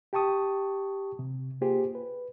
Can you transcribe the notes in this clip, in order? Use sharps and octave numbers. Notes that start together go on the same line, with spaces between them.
G4 G5 A5 C#6 D#6
C3
A#3 F4 G4 G#4 C5
B4